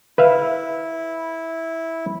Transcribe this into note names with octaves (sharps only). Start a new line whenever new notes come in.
E4 B4 E5 F5